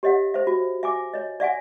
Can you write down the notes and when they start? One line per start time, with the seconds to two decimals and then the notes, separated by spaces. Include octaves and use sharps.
0.03 G4 C#5 D#5 E5 F#5
0.34 C5 E5
0.47 F#4
0.83 E5 G#5 D6
1.14 C#5 D#5
1.40 D5 E5 F#5 G#5